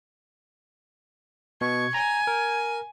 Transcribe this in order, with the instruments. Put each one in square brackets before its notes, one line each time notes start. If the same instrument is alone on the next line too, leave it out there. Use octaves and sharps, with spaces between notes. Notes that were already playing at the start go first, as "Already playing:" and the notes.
[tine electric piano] B2 [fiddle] C#6 [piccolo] G#6
[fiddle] G#5 [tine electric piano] A#5
[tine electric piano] A#4